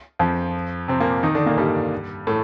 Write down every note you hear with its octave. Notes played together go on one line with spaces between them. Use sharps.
F2 F3
C3 C4
A#2 A#3
D#3 D#4
D3 D4
A#2 A#3
G2 G3
A2 A3